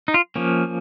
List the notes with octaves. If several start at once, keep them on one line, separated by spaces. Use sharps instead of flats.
D#4
F4
F3 A#3 C#4